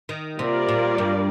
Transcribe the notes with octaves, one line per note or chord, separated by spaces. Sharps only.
D#3
C3 G3 A#3 F4 A#4 D5
A#2
G2